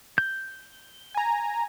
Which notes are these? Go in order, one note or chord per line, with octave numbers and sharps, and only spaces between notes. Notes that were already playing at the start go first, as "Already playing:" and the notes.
G6
G#5 A#5